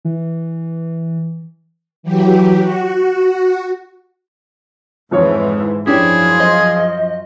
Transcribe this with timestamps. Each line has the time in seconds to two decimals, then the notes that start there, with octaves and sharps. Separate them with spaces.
0.05 E3
2.03 E3 F#3 G4
2.60 F#4
5.11 F2 G#2 E3 F3 C#5
5.87 F#2 F3 C#4 D4 E4 G4 G#4
6.40 C5 D#5